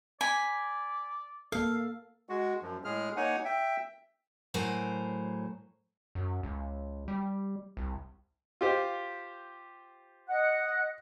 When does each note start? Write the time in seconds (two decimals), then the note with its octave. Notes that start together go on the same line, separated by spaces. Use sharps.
0.21 D5 G#5 B5
1.52 A#3 A4 F5
2.29 G#3 F#4
2.62 F#2 F3
2.85 A2 G#3 G#4 F6
3.17 A#3 D#4 C#5 F#5 G#5
3.45 E5 G5
4.54 A2 F#3 A#4 C5 G#5
6.15 F#2
6.43 C#2
7.08 G3
7.77 C2
8.61 F4 G4 C5
10.28 D#5 F#5 F#6